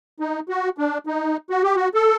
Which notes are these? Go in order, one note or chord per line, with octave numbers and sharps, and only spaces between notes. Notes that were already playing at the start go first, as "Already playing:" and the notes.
D#4
F#4
D4
D#4
F#4
G4
F#4
A4